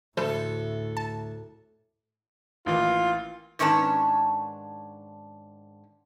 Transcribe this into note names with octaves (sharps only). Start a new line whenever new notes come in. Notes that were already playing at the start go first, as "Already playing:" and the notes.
D2 A2 F3 A4 B4 C5
A5
A1 E3 A#3 F4
G#2 D#3 C#4 D4 B4 A5